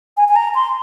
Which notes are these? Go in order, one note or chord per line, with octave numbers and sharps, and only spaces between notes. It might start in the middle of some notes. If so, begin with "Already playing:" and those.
G#5
G#5
A#5
C6